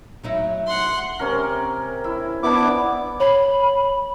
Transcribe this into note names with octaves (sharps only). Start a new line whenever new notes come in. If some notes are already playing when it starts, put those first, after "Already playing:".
F#3 D#4 E4
F#5 C6
C3 C#4 A#4
E4
B3 D4 E4 F#5 D6
C#5 B5